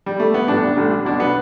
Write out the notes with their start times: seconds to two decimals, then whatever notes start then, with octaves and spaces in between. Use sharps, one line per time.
0.06 G3
0.19 A3
0.34 B3
0.48 A1 G2 D3 D4
0.76 A1 G2 D3
1.05 B1 B2 D4
1.20 B3